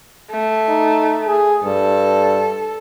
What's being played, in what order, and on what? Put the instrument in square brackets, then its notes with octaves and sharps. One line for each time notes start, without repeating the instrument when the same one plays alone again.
[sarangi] A3
[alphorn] D#4
G#4
[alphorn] G2 [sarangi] A4